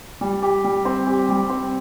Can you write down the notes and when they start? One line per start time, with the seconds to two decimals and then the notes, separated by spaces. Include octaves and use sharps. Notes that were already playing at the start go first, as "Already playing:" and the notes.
0.21 G3
0.42 G4
0.64 G3
0.85 C4
1.07 G4
1.29 G3
1.50 C4